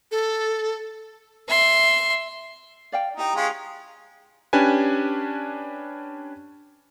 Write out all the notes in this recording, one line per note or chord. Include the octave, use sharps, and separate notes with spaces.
A4
E5 C6
D5 F5 G5
D#4 E4 G4 G5
G#3 C#4 F4
C#4 D4 G4 B4 G#5